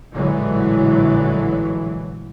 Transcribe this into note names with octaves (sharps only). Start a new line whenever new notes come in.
A#1 A2 D3 E3 F#3 G#3